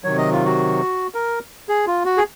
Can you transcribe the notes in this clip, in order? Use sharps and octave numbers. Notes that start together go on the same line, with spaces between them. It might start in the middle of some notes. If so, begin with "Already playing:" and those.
C3 D#3 F#3 C#5
D#5
F4
F#4
A#4
G#4
F4
F#4
G#4